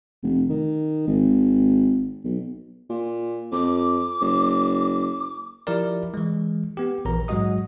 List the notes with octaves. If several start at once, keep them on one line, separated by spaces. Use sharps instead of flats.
F1
D#3
G#1
B1
A#2
F2 D6
F#1
F3 E4 G4 A#4 D5
E3 G#3
B3 G4
A#1 E3 A#4 A#5
G#2 F#3 G#3 F#4 D#5 D#6